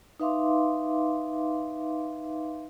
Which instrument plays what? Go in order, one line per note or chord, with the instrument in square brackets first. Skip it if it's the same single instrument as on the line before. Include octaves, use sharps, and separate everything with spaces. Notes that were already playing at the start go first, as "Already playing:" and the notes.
[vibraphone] D#4 B4 E5 F5 C6 D6